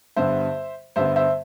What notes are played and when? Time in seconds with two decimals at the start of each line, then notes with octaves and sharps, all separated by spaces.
0.16 G2 D3 G3 B3 C5 E5
0.96 G2 D3 G3 B3 C5 E5
1.16 C5 E5